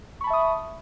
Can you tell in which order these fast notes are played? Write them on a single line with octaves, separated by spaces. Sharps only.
C#6 B5 A5 E5 D#6